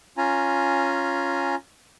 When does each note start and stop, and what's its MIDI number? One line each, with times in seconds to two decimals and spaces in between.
0.17 1.55 61
0.17 1.55 65
0.17 1.55 80
0.17 1.55 82